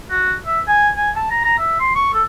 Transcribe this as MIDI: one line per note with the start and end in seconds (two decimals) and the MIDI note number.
0.11 0.34 66
0.46 0.60 76
0.68 0.90 80
0.96 1.11 80
1.16 1.29 81
1.31 1.43 82
1.44 1.57 82
1.58 1.75 76
1.80 1.95 84
1.95 2.09 85
2.13 2.23 69